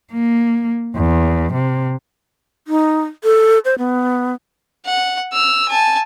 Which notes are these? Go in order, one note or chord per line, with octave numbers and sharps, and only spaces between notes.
A#3
E2
C3
D#4
A4
C5
B3
F#5
E6 F6
G#5 A5